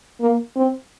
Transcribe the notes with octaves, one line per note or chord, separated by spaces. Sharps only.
A#3
C4